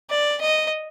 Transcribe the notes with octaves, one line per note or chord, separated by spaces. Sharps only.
D5
D#5